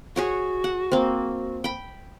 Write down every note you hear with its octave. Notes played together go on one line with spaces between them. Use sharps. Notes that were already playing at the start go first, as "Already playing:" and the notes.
F#4 G#4 C#5 F#5
F#5
A#3 C4
G5 B5